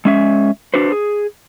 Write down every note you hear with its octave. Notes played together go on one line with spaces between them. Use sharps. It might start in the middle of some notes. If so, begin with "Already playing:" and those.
G#3 C#4 E5
D4 F#4 B4 C5
G#4